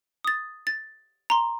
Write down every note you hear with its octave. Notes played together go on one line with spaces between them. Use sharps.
D#6 A6
A6
A#5 C6